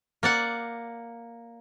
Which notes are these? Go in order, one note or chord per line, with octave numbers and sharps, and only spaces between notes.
A#3 D5 F#5